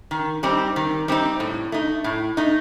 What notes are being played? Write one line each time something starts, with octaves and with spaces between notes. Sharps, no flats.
D#3
G3 C4 D#4
D#3
G3 C4 D#4
A2
A3 D#4
A2
A3 D#4